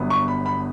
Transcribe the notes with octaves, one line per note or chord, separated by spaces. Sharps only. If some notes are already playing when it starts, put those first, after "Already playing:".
Already playing: G1 G2 F#3 B3
C#6
B5
B5